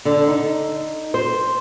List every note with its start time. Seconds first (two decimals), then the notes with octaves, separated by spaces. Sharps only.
0.05 D3
0.27 D#4
1.14 C5